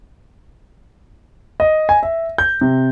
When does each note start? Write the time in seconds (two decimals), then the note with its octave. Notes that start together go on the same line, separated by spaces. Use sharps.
1.60 D#5
1.89 G#5
2.03 E5
2.38 G6
2.61 C3